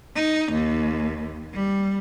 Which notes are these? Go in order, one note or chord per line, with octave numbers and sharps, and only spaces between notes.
D#4
D#2
G3